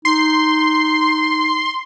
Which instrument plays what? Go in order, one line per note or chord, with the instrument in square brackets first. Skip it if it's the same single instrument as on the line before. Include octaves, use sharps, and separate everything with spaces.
[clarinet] D#4 [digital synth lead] C6